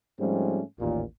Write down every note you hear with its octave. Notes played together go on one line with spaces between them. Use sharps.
G#2 F3 G3 A3 C4 C#4
A1 D#2 A#2